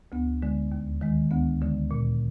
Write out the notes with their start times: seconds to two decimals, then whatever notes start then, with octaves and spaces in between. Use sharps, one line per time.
0.12 D2 B3
0.42 D3 G#3
0.72 D#2
1.01 D#3 G#3
1.31 D2 B3
1.62 D3 G#3
1.91 A#2